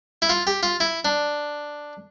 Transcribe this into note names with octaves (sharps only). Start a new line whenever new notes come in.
E4
F4
G4
F4
E4
D4